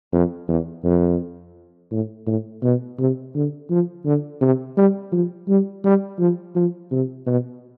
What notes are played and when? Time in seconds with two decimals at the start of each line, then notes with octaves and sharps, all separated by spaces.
0.13 F2
0.48 E2
0.84 F2
1.91 A2
2.27 A2
2.63 B2
2.99 C3
3.35 D3
3.70 F3
4.05 D3
4.41 C3
4.77 G3
5.12 F3
5.48 G3
5.84 G3
6.19 F3
6.55 F3
6.92 C3
7.27 B2